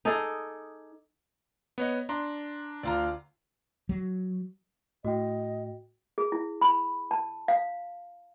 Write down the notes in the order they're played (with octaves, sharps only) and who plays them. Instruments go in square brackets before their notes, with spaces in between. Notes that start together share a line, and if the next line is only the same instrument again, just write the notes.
[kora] D#4 G#4 A4 D5
[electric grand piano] B3 C#5 D#5
D4 A#5 C6
[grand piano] D2 F4 A#5 [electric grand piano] D5
[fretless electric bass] F#3
[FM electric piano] A2 [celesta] F#4 G5 [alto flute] D#5
[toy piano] G#4
E4
B5
A5
F5